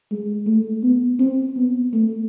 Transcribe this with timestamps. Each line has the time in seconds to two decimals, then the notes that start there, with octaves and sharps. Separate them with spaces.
0.11 G#3
0.46 A3
0.83 B3
1.20 C4
1.56 B3
1.93 A3